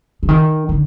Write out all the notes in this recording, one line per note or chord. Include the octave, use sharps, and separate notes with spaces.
D3
D#3
D3